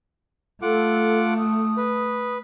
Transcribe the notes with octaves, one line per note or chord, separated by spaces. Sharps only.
A3 F4 A4 F#5 D6
D#6
B4